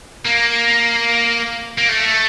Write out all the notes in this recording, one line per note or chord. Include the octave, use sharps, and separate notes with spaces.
A#3
A#3
A3